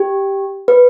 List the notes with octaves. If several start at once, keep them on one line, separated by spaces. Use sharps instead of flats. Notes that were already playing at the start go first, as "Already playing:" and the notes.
Already playing: G4
B4